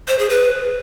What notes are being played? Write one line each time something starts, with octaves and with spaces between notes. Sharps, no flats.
C5
G#4
B4